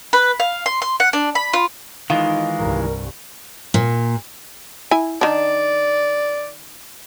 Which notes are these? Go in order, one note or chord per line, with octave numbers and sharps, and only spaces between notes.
B4
F5
C6
C6
F#5
D4
B5
F4
D#3 E3 G#3 D#4 F4
C2 G2 A#4
A#2
E4 G#5
D#3 D4 D5